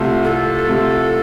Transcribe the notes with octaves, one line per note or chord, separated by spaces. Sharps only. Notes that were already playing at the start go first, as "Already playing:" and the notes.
Already playing: C2 C3 A3 F4
C2 A4
C3 A3 F4